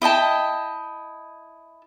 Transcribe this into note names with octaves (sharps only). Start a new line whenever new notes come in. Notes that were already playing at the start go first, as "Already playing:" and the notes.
E4 D#5 G5 A5